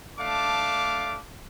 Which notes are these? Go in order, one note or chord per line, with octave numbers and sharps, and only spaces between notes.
A3 D4 F5 A5 D6